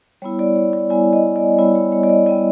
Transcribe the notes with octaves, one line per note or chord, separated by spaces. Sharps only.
G3 B3 E4 C#5
D5
C#5
D5
G3 B3 E4 G#5
D#5
D5
G3 B3 E4 C#5
C#5
C#5
D5
D#5
G3 B3 E4 D#5